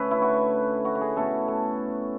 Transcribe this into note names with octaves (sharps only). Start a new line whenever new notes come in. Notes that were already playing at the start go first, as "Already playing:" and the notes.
Already playing: D3 A3 C#4 B4 E5
E4
F#4
F#4
F#4
G#4
B2 A3 C#4 A4
A4